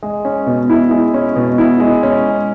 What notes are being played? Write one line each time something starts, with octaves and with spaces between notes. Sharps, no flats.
G#3
C#4
B2
E4
G#3
C#4
B2
E4
G#3
C#4